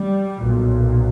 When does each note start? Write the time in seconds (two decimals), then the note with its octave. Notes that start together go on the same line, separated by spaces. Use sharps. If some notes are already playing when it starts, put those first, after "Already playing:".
Already playing: G3
0.39 B1 A#2